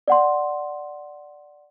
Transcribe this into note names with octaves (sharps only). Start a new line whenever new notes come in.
D5 F#5 C6